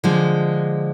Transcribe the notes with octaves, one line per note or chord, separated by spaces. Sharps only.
D3 F3 G#3